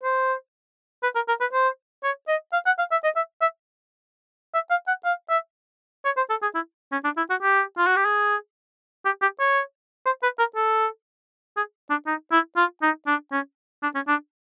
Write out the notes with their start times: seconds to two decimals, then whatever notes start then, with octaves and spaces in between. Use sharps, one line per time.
0.03 C5
1.03 B4
1.15 A#4
1.28 A#4
1.41 B4
1.53 C5
2.03 C#5
2.28 D#5
2.53 F5
2.66 F#5
2.78 F5
2.91 E5
3.04 D#5
3.16 E5
3.41 E5
4.54 E5
4.70 F5
4.88 F#5
5.05 F5
5.30 E5
6.05 C#5
6.17 C5
6.30 A4
6.42 G#4
6.55 E4
6.92 C#4
7.04 D4
7.17 E4
7.30 F#4
7.42 G4
7.78 F4
7.87 F#4
7.96 G4
8.05 G#4
9.06 G4
9.22 G4
9.40 C#5
10.06 C5
10.23 B4
10.39 A#4
10.56 A4
11.57 G#4
11.90 D4
12.07 D#4
12.32 E4
12.57 F4
12.82 D#4
13.07 D4
13.32 C#4
13.83 D4
13.95 C#4
14.07 D4